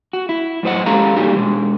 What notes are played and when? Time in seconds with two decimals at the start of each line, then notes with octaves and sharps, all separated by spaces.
0.13 F#4
0.29 E4
0.63 F#2 A2 C5 D#5 F#5
0.86 G#3 C#4 G4 A4 F5 A#5
1.16 A#2 G3 D#4 F#4 G4
1.35 B2 G#3